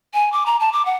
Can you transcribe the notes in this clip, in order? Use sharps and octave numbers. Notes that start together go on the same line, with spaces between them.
G#5
D6
A#5
A5
D6
F#5